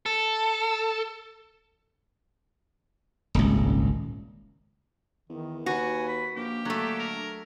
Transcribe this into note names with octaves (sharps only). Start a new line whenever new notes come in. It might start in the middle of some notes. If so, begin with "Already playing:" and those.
A4
D#1 G#1 C#2
E2 D#3
D#2 F#4 B4 G#5
B5
A#1 A#3 G4
D3 F#3 A3
A#4